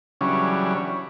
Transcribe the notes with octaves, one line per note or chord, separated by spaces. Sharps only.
C#3 E3 F#3 G3 C#4 D4